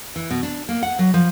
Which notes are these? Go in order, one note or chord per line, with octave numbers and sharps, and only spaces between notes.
E3
B2
D4
A#3
F#5
F#3
F3